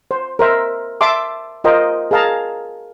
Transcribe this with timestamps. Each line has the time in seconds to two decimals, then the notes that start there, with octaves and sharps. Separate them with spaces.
0.11 C5
0.39 A#4 C5 E5
1.01 E5 A5 C6 D6
1.64 F4 A#4 C5 D#5 G5
2.11 G#4 A#4 F5 A5 A#5